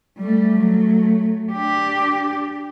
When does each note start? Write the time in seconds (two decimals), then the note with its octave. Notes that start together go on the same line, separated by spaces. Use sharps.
0.18 G3 A3
0.58 F#3 A3
1.53 D4 G4